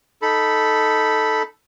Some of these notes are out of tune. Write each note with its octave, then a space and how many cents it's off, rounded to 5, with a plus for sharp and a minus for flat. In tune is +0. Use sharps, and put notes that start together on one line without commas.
D#4 +0 A4 +0 B5 -5